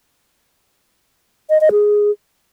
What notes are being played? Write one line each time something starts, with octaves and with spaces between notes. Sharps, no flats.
D#5
D#5
G#4